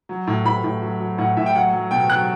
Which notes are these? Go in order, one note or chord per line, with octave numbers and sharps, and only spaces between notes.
F#3
A2
A2 B5
A2
F#3
F#3
A2 F#5
A2 E5
G5
F#3 F#5
F#3
B2 G5
F#3 F#6